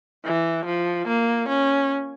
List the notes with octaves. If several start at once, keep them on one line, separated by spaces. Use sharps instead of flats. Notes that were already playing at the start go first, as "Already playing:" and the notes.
E3
F3
A#3
C#4